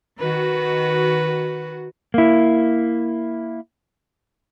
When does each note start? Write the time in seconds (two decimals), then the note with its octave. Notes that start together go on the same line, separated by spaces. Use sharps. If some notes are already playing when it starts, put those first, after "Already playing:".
0.19 D#3 F#4 B4
2.14 A#3 E4